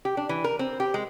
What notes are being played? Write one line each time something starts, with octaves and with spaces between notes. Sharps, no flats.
G4
D4
E3
A#4
C4
G4
G#3